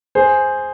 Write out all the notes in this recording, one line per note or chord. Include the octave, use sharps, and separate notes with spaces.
G#4 C5